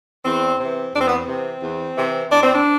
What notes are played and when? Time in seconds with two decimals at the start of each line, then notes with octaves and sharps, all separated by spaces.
0.25 E2 C4
0.59 C3 E3 C4
0.93 E2 D4
1.00 C4
1.08 B3
1.15 C4
1.28 C3 E3
1.62 E2
1.96 C3 E3
2.30 E2 D4
2.42 C4
2.54 D4